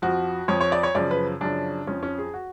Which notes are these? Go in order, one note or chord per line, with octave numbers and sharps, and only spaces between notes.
F2 F3 F#4
F2 F3 C#5
C#5
D5
C#5
F#2 C#3 F3 D5
B4
F#2 C#3 F3 D4
F2 F3 C#4
C#4
G#4
F#4